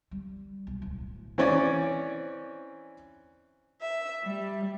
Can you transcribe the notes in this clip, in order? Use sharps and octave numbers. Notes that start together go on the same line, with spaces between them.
G3
B1
D1
E3 C4 C#4 C#5 D5
E5
G3